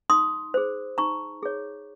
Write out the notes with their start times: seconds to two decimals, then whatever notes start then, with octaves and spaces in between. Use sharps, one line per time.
0.10 D#4 C6 D#6
0.54 G#4 C5
0.98 D#4 A#5 C#6
1.43 G#4 C#5